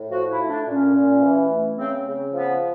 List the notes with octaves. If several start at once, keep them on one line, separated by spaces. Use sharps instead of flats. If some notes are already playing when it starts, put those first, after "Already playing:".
Already playing: A2
F3 F#4
E4
A3
D4
A#2 C#4
A#2
E3
A3
C#3 C4
C#3
F3 B3